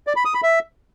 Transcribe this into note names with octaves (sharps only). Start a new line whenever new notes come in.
D5
B5
D#6
B5
E5